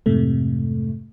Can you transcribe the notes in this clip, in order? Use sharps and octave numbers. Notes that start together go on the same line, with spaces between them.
F2 G#2 C3 A3